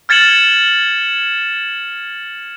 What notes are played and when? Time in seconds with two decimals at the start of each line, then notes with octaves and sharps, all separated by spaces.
0.09 F6 G#6 A6 C#7 E7 F#7